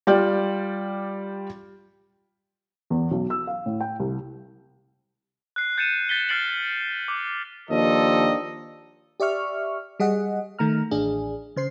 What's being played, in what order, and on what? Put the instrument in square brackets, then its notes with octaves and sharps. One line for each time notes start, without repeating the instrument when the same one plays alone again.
[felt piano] G3 F4 D5 G5 F6 G6
[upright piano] E2
B1
E6
F5
A2
G5
C2
[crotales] F#6 C7
G6 A6 C#7 D#7 E7
G6 A6 B6 G7
F6 F#6 A6 C7 D7 F#7
D6
[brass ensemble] D#2 D#3 F3 D4 A4 D#5
[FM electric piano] G4 D5 E5 C#6 F6
G3 G#4 D#5 F#5
D#3 A3 A#5 F6
A1 D4 G#4
C#3 C5 C7